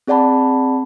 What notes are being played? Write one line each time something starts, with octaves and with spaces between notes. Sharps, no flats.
C4 G#4 D5 F#5 A5 B5